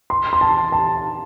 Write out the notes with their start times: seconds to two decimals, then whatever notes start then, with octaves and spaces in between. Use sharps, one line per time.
0.10 C6
0.33 C6
0.41 A5
0.72 A5